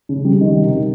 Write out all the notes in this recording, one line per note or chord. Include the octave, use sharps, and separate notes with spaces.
C#3
G3
D#3
C3
C3